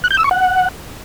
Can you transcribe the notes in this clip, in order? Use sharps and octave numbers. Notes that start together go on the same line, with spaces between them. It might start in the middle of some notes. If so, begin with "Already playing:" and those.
F#6
G6
E6
C#6
F#5